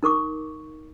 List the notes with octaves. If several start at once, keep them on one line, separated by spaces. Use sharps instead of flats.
D#4 A#4 C#6 D6